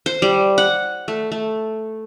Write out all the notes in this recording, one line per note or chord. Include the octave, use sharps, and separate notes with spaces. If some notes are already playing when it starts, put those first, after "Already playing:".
C5
G3
F#5
A3
A3